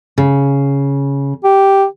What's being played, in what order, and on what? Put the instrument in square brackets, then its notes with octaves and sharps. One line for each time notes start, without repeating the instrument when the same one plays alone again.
[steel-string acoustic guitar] C#3
[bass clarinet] G4